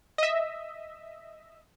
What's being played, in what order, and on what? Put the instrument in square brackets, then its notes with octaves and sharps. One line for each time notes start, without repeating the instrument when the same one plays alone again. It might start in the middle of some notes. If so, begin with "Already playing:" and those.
[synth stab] D#5 E5